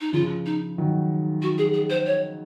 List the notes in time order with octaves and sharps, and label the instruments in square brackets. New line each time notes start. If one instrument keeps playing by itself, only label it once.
[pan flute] D#4
[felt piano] C#3 F3 [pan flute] F4
[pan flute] D#4
[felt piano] D#3 F#3
[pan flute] F#4
G#4
G#4
C5
C#5